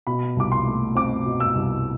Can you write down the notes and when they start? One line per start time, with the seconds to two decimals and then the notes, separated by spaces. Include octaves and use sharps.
0.07 B2 B5
0.37 C2 D6
0.52 C6
0.66 A3
0.95 C4 D6
1.26 B2
1.40 E6
1.55 C2